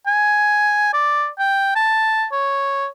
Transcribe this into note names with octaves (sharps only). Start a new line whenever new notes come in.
G#5
D5
G5
A5
C#5